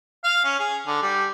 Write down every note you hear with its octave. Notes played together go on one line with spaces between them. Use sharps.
F5
C#4
G#4
D3
G3